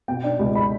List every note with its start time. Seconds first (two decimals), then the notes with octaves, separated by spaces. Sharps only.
0.08 B2 G5
0.24 D4
0.39 C#2
0.55 B5